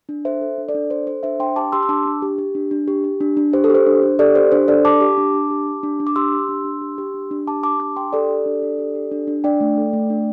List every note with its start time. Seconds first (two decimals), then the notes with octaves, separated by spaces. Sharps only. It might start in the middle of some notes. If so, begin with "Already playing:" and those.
0.09 D4
0.25 A4 C5 E5
0.41 A4
0.58 D4
0.69 A4 D5
0.75 D4
0.90 A4 C5
1.07 A4 C5
1.23 D4 C5 E5
1.39 D4 G5 C6
1.56 G4 A5 D6
1.72 G4 C6 E6
1.83 E6
1.89 D4 A5 D6
2.05 D4
2.22 G4
2.38 G4
2.55 D4
2.71 D4
2.88 G4
3.04 G4
3.21 D4
3.37 D4
3.53 G4 C5
3.64 A4
3.70 G4 C5
3.86 D4
4.02 D4
4.19 G4 A4 D5
4.35 G4 C5
4.52 D4 C5
4.68 D4 A4 D5
4.85 G4 A5 D6
5.01 G4
5.17 D4
5.34 D4
5.51 G4
5.67 G4
5.83 D4
6.00 D4
6.07 D6
6.16 G4 C6 E6
6.32 G4
6.49 D4
6.65 D4
6.81 G4
6.98 G4
7.14 D4
7.31 D4
7.47 G4 A5 D6
7.63 G4 A5 D6
7.80 D4 A5 D6
7.96 D4 G5 C6
8.13 G4 A4 D5
8.30 G4
8.46 D4
8.62 D4
8.79 G4
8.95 G4
9.12 D4
9.27 D4
9.44 D4 D5 G5
9.60 A3
9.77 A4
9.93 A3
10.10 D4